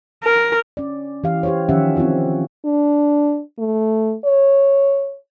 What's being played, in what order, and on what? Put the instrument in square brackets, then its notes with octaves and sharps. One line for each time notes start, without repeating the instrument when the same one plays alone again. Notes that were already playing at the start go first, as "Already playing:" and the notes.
[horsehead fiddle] A#4
[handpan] C#4 D5
E3 G4 F5
G4 C5 C#5
D#3 F3 C#4 G4 E5 F#5
C4 D#4 F4 C#5
[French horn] D4
A3
C#5